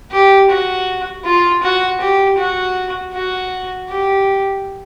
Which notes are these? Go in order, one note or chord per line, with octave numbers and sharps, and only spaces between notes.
G4
F#4
F4
F#4
G4
F#4
F#4
G4